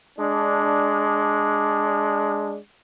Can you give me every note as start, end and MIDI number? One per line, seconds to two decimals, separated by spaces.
0.18 2.56 56
0.18 2.56 62